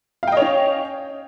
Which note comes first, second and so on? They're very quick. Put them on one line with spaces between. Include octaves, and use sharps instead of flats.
F5 G5 D#5 C#5 C#4